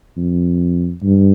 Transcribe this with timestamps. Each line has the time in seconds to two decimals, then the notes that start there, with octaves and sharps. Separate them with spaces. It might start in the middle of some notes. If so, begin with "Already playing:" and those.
0.17 F2
1.03 G2